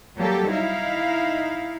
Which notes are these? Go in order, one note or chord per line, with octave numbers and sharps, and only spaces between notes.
F#3 G3 A#3 G4 A4
D#4 E4 F5